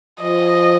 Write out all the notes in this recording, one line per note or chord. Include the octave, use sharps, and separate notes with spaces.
F3 D#5